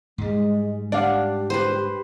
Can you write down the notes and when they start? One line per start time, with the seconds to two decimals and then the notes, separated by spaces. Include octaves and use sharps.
0.18 G#2 G3 G#3
0.92 D4 G4 D5 F5 F#5
1.50 B4 C5